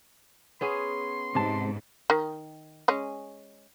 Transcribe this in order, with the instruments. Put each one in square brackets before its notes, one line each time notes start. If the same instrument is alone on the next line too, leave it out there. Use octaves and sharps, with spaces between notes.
[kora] B3 C#4 G#4 [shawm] C6
[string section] G#2 [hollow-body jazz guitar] C3 A5
[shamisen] D#3
G#3 C#4